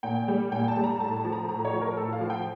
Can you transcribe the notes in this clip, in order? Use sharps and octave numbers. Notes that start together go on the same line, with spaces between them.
A#2 G5
G3
A#2 G5
A5
G3
A#5
A2 A5
A5
F3
A#5
A2 A#5
C#5
F3
A#4
A2 A4
F5
F3
G5